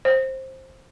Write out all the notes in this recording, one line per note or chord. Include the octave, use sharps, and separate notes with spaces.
C5